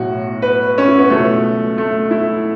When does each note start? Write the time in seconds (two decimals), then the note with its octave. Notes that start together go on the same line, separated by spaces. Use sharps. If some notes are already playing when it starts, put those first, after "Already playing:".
Already playing: B1 A2 F#3 F#4
0.42 B4
0.78 C#4
0.88 E4
0.98 B3
1.10 C#2 B2 F#3 A3
1.78 A3
2.11 E4